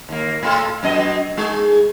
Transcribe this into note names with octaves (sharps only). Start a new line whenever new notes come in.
D#2 A#3
A2 F4 A4
F#2 B2 D#5
G#3 D#4 G#4